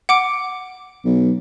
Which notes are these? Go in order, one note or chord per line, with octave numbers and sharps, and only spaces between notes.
F#5 D6 D7
B1